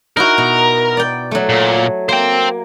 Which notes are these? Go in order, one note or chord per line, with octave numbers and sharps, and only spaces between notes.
D#4 E4 F#4 A#4
B2
D5 G5
F#3 A3
A#2
A#3 C5 G5